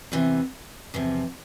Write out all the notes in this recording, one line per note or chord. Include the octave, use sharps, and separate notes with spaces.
E2 C3 E3
E2 C3 F3